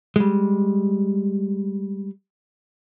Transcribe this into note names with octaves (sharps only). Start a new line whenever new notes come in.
G3 G#3